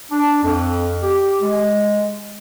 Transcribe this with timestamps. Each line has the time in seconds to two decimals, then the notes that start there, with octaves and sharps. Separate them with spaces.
0.11 D4
0.44 F2
1.02 G4
1.42 G#3